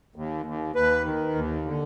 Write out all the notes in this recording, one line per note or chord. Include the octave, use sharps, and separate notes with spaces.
D#2
D#2
D#2 B4
D#3
D#2
D3